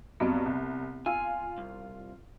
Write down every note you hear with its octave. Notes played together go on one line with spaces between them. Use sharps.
G2 F#3 B3 C4 D#5
C2
F4 G#5 E6
C2